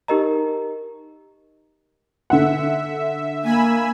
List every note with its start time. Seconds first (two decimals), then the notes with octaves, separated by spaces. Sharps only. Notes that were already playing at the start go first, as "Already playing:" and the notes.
0.08 D#4 G4 A#4 D#5 A#5
2.30 D3 E5 F#5
3.44 A#3 G#5 B5 E6